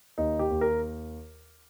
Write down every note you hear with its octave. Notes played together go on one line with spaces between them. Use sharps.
D#2 D#4
G4
D#2
A#4